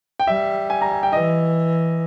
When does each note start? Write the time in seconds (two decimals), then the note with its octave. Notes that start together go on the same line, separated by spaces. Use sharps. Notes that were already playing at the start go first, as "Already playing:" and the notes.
0.19 G5
0.27 G3 E5
0.70 G#5
0.81 A#5
0.92 G#5
1.03 G5
1.13 E3 D#5